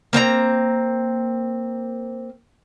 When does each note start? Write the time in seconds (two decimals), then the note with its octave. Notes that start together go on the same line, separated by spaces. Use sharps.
0.13 A#3 C4 D4 A#5